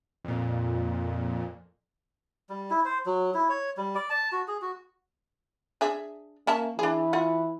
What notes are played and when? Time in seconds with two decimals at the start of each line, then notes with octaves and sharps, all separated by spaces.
0.24 F2 A#2
2.49 G3
2.70 E4
2.85 C5
3.06 F#3
3.34 E4
3.49 C#5
3.77 G3
3.95 D5
4.10 A5
4.32 F#4
4.48 G#4
4.62 F#4
5.81 D4 G#4 E5
6.47 A#3 C#4 E5 A5
6.79 E3 D4 G#4
7.13 F4 F#5